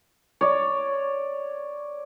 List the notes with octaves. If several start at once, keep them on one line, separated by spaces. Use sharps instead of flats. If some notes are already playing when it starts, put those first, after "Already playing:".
C#5 D5